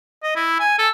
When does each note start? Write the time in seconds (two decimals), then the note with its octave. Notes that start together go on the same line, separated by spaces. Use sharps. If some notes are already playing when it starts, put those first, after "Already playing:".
0.23 D#5
0.36 E4
0.60 G#5
0.79 A4